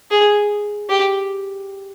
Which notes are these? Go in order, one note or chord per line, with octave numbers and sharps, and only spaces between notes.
G#4
G4